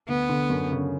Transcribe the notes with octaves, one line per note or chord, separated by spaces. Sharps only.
D2 B3
D3
F#2
C#3